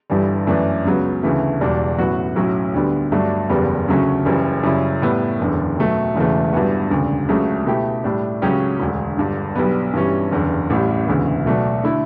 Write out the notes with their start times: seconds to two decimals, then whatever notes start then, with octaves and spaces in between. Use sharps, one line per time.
0.10 G1 G2 E3 G3
0.47 F#2 E3 A3 D4
0.85 C#2 C#3 F#3 B3
1.23 D2 C#3 E3 A3
1.60 E1 E2 B2 G3 D4
1.98 A1 A2 F#3 B3 F#4
2.36 B1 A2 F#3 C#4
2.74 D2 D3 G3 B3
3.12 G2 F#3 A3 D4
3.49 F#1 E2 C#3 G3 B3
3.88 D2 C#3 F#3 A3 C#4
4.25 F#1 F#2 C#3 E3 G3
4.63 F#2 C#3 G3 C#4 E4
5.02 A2 G3 B3
5.39 F#1 E2 D3
5.77 B1 B2 F#3 A3
6.16 E1 E2 C#3 E3 A3
6.53 G1 G2 E3 B3 F#4
6.90 E1 D2 C#3
7.29 C#2 C#3 F#3 A3
7.66 B2 A3 E4 G4
8.04 A2 G3 D4
8.42 C#2 C#3 F#3 C#4 G4
8.80 E1 D2 D3
9.18 G1 G2 D3
9.55 B1 B2 G3 B3
9.94 G2 E3 G3 C#4
10.31 F#1 E2 D3
10.70 A1 A2 G3
11.07 E1 D2 C#3 E3 B3
11.46 B1 B2 A3 D4 F#4
11.84 D3 A3 E4